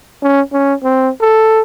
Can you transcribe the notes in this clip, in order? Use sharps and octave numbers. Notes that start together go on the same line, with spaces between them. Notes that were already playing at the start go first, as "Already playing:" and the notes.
C#4
C#4
C4
A4